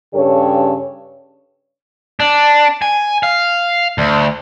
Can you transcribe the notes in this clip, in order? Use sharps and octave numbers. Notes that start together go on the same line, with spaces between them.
G2 C#3 G4 A4 C#5
D4
G#5
F5
D2